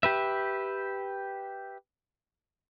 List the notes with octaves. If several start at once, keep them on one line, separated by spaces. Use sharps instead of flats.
G4 B4 E5